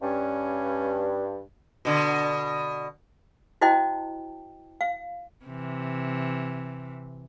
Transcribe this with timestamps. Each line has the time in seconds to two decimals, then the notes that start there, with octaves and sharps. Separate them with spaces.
0.02 G2 C#4
1.85 B2 D3
3.61 E4 F#4 C5 D#5 G5 A5
4.81 F5
5.46 C3 E3